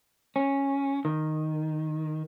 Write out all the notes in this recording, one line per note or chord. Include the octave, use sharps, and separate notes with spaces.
C#4
D#3